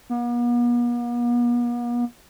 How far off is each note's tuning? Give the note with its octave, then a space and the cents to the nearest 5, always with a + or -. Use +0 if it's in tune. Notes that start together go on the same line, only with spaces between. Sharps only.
B3 -45